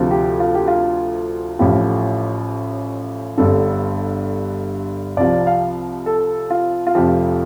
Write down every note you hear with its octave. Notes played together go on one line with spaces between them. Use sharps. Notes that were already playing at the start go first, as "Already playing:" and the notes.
Already playing: D2 C3 F3
G4
F4
G4
F4
A1 A2 F3 G4
G1 G2 D3 A4
C2 C3 F3 D5
F5
A4
F4
F4
F1 F2 F3 G4